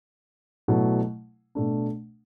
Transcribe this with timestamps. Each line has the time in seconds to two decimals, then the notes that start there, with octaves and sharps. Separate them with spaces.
0.68 B2 F#3 A3 E4
1.55 B2 A3 D4